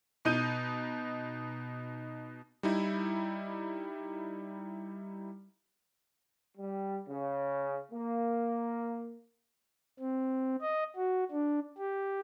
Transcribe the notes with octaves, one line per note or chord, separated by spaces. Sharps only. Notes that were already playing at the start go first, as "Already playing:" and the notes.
B2 D#4 G6 D#7
G3 D#4 E4
G3
C#3
A#3
C4
D#5
F#4
D4
G4